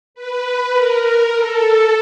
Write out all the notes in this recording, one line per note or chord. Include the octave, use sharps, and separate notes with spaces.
B4
A#4
A4